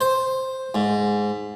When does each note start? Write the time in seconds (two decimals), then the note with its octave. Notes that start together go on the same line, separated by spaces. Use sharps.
0.01 C5
0.74 G#2